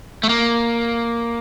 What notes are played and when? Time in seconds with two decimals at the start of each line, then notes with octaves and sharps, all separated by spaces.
0.23 A3
0.29 A#3